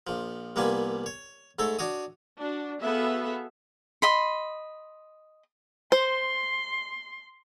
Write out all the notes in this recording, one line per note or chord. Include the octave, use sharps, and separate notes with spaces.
A#1 F3
C2 F3 G3 A#3 B3 G#5
C#5
G#2 A3 A4 C#5
D4 F#4 C#5 D#6
D4 F#4
B3 F#4 G#4 A4 E5 F5
D#5 B5 C6
C5 C6